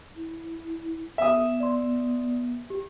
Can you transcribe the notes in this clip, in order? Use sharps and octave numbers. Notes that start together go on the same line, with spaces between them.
E4
B3 E5 D#6
D5 C6
G4